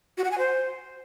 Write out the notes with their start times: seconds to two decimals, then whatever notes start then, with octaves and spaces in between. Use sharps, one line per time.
0.18 F#4
0.24 F#5
0.31 G#5
0.38 C5